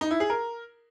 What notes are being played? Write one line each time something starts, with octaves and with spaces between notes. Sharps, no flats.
D#4
E4
G#4
A#4